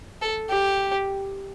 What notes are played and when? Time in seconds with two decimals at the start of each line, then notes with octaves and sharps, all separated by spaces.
0.22 A4
0.50 G4